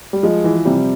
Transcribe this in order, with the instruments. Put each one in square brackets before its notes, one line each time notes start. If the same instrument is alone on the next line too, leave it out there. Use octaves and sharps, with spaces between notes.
[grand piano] G3
[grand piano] F3 [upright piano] G#3
[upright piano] E3
[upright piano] C3 [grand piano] G3